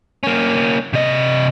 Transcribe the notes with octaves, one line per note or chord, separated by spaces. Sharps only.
A#3 C#4
C3 D#5